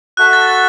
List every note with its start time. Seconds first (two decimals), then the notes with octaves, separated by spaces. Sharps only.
0.17 F#4 A4 E5 F#6
0.33 A6
0.47 A6